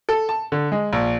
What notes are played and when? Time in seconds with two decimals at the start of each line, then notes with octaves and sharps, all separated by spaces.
0.09 A4
0.29 A5
0.52 D3
0.72 G#3
0.93 A#1